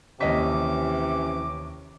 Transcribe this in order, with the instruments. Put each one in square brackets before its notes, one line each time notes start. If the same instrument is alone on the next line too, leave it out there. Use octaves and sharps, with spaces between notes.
[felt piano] D#2 D#5 B6 [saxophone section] C3 E3 C#4 [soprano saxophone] D6